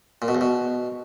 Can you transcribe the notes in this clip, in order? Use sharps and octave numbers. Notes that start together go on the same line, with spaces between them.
A#2
B2
E2
B2